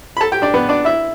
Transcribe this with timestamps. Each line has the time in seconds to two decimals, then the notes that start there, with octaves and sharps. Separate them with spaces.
0.17 B5
0.21 A4 A5
0.32 G4 G5
0.42 D4 D5
0.54 B3 B4
0.69 D4 D5
0.85 E4 E5